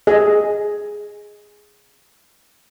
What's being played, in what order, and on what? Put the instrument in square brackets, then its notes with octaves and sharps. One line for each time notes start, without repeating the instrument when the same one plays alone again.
[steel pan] G#4 D#5